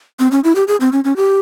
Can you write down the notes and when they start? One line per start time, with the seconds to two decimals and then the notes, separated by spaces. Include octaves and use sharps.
0.19 C4
0.31 C#4
0.44 E4
0.55 G4
0.68 G#4
0.80 C4
0.92 C#4
1.04 C#4
1.16 G4